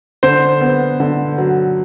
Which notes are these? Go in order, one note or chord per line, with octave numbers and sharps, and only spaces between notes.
D3 C5
B3
D3
F#3